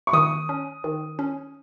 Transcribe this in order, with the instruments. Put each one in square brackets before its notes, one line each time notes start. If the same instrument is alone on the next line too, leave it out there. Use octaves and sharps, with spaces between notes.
[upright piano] C#6
[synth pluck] D#3 [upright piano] D#6
[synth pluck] C#4
D#3
C#4